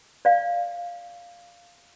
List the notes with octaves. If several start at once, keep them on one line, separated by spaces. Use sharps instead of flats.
D5 F5